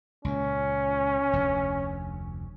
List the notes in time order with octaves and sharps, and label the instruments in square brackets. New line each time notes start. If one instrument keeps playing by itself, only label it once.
[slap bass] C#2 A#2 [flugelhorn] C#4
[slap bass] F1 D2